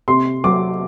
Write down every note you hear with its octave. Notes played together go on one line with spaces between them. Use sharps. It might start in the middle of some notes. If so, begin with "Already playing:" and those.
C3 C6
F#3 D6